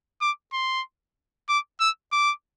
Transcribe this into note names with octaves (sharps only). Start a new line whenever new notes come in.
D6
C6
D6
E6
D6